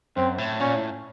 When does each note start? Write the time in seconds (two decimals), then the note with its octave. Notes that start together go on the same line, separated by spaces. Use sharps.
0.16 F#2 C4
0.38 A2
0.60 A#2 C#4
0.75 A2